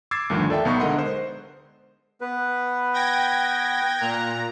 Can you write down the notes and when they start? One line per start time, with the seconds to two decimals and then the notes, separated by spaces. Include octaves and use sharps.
0.11 D6 E6 G#6 A6 C7
0.30 D2 G2 A#2 D#3 F3
0.50 A4 D5 E5 G5 A5
0.65 B1 B3 D#4 A#5 C#6
0.79 D3 G#3 A#4 D#5 F#5 C6
0.99 C5
2.21 B3 B4
2.94 G5 G#6 A#6
4.00 A#2 A#5 F#6